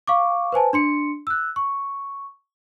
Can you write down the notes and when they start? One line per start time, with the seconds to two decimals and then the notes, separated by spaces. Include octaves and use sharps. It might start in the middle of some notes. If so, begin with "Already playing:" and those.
0.07 F5 C#6 D6
0.52 B4 C5 G#5 A5
0.73 D4 C6 C#7
1.27 E6 F#6
1.56 C#6